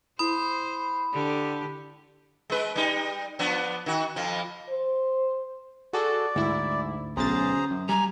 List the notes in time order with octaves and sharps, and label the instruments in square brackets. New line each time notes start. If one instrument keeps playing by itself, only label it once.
[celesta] E4 D#6 [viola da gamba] C5 [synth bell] B5
[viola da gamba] D3 G4
[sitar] G#3 B4
G3 D#4
F3 B3 D4
D#3 F#4
F2 F3
[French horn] C5
[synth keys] F#4 G#4 A4 [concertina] D5
[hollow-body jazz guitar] D2 [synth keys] G#2 E4
[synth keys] B1 B2 A6 [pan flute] C#4 [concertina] G#4 C5 A#5
[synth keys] F#2
[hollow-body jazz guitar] G3 [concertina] G#5 [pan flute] A#5